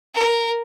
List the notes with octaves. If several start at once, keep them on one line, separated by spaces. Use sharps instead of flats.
A#4